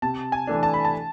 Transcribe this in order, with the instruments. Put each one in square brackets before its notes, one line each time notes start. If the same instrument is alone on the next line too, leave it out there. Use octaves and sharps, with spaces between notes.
[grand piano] C3 A5
G#5
E3 A3 D4
A5
B5
A5